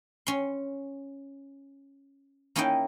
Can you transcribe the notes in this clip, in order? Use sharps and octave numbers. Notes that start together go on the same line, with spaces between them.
C#4 C6
A#3 C#4 D#4 E4 D#5 G5